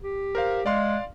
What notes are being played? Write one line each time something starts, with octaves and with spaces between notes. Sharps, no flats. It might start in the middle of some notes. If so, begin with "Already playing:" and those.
G4
A#4 C5 F5
G#3 D5 F5 C6